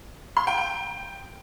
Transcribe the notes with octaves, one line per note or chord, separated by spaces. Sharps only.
C6
G5
G5